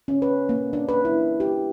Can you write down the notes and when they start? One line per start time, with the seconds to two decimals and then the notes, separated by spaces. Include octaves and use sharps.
0.08 C#4
0.22 B4
0.49 A#3
0.73 D4
0.89 B4
1.05 E4
1.40 G4